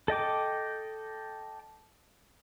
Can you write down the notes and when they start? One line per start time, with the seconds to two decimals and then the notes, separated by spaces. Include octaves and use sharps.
0.08 A4 D#5 G5 D6